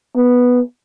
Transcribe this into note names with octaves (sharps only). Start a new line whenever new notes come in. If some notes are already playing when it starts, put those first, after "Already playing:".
B3